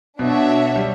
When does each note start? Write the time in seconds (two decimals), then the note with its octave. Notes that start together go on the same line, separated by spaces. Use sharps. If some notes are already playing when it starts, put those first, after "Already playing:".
0.19 B2 D4 F#4 C#5 E5
0.76 G3